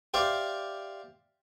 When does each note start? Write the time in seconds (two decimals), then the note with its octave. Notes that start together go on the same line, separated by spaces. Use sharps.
0.14 G4 C5 D5 E5 F5